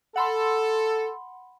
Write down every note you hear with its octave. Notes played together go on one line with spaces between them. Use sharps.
A4 F#5 B5 C6